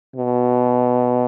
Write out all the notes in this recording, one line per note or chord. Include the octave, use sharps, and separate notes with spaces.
B2